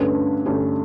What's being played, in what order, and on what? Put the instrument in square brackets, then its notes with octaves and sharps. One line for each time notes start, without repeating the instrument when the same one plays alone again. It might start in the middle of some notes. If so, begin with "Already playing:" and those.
Already playing: [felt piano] G2 D3 A3 C#4 B4
G2 D3 A3 C#4